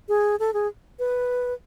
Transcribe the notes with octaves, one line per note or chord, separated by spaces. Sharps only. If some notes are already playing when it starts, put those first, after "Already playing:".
G#4
A4
G#4
B4